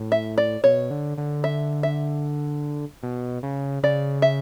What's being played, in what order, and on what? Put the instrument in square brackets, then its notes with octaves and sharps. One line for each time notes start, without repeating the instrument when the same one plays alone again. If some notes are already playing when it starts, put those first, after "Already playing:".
Already playing: [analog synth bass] A2
[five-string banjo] E5
D5
[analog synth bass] B2 [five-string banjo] C#5
[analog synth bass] D3
D3
[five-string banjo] E5
E5
[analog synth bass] B2
C#3
[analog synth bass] C#3 [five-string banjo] D5
[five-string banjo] E5